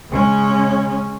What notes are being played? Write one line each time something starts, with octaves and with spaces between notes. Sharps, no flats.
C#3 G#3 C#4